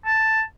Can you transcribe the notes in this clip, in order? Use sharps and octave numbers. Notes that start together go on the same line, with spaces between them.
A5